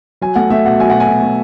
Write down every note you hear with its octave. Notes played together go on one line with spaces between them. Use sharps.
F#3 G#5
A3 F#5
A3 E5
B2 F#5
F#3 G#5
B2 F#5
G#5
B2
A3